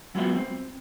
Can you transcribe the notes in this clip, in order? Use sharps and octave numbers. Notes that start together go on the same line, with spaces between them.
F#3 G#3 B3 F4 F#4 E5
C4